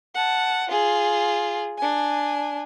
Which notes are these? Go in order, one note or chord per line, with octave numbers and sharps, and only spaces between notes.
F#5 A5
F4 G#4
D4 G#5